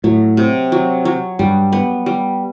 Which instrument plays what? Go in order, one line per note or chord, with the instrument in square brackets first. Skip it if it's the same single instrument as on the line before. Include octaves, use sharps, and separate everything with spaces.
[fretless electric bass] A2 [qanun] F#3
[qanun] C3
F#3
F#3
[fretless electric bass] G2 [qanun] G3
[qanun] B3
G3